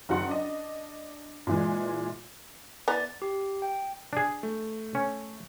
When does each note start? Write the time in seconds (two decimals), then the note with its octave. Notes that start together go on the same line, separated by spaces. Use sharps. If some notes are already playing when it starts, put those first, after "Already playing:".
0.09 F#1 D#3 F#4 F#5 C6
0.28 D4 D#5
1.47 A#2 E3 G#3
2.88 B3 E4 D5 A#5 A6
3.22 G4
3.62 G5
4.13 D4 G#4
4.43 A3
4.95 C#4